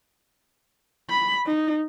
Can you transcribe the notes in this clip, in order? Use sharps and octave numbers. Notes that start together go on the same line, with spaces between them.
B5
D#4